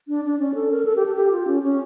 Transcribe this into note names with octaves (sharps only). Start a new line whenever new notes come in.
D4
D4
C#4
A4
A#4
A4
G4
A4
G4
F4
C#4
C#4